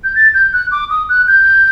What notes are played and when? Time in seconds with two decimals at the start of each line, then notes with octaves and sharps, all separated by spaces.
0.04 G6
0.15 A6
0.34 G6
0.53 F#6
0.71 D6
0.90 D#6
1.09 F#6
1.27 G6